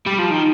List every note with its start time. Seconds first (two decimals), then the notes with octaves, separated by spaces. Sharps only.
0.06 G3
0.19 F3
0.30 D#3